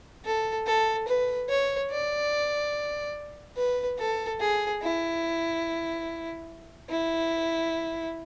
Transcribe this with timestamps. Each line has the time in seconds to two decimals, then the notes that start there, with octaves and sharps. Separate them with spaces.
0.25 A4
0.67 A4
1.08 B4
1.49 C#5
1.91 D5
3.57 B4
3.99 A4
4.40 G#4
4.82 E4
6.89 E4